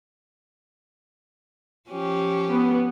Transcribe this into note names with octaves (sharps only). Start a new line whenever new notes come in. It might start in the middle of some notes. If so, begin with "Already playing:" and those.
F3 C#4 G4
B3